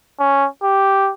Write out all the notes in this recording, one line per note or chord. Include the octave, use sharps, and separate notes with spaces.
C#4
G4